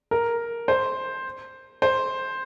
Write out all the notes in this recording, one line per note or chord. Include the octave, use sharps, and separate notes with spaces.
A#4
C5
C5